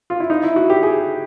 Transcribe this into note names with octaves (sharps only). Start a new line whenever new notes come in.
F4
E4
D#4
E4
F#4
G4
G#4